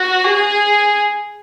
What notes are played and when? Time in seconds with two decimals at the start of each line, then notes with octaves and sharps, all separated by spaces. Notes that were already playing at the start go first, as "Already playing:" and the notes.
Already playing: F#4
0.24 G#4